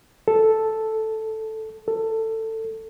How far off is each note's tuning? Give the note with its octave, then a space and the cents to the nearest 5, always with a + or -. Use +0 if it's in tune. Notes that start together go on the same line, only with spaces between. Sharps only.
A4 +0
A4 +20